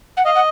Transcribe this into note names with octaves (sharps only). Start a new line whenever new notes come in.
F#5
D#5 F5
F#5